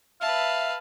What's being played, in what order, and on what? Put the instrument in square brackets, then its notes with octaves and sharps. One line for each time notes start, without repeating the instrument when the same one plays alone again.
[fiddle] B4 A5 [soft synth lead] E5 [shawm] F5